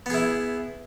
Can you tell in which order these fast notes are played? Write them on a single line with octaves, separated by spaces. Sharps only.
B3 G#4 E4